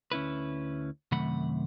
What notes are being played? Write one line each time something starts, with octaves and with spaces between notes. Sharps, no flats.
D2 C#4 E4 B4
F#2 C3 D#3 A3 F#5 B5